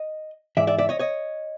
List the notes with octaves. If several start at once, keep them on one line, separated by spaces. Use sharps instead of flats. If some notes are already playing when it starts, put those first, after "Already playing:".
Already playing: D#5
G#2 E3 D5 E5
D5 E5
D5 E5
C#5 D#5
C#5 D#5